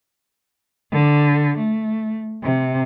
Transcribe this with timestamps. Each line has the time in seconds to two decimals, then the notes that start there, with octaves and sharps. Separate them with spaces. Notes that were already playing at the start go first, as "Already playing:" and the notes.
0.92 D3
1.58 A3
2.43 C3